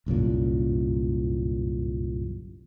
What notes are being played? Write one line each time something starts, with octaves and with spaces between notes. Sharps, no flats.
G1 C2 F#2 A#2